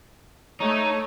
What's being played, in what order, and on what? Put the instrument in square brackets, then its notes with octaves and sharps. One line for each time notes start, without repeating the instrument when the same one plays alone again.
[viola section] A3 [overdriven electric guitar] D#4 [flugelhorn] C#5